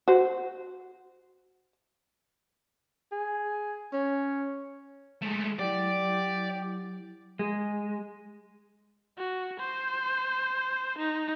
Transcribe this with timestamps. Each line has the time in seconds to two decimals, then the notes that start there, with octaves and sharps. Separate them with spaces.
0.08 F#4 C5
3.12 G#4
3.93 C#4
5.22 G#3 A3
5.59 F#3 E4 G4 D5
7.39 G#3
9.18 F#4
9.60 C5
10.98 D#4